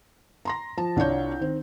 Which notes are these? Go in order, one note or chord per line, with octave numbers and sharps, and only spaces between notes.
A#5 C6 A#6
F3 A5
C2 D4 F4 C#5 G6
D#3 C4